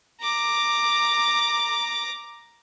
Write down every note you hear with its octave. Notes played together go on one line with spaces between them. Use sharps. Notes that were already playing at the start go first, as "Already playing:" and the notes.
A#5 D6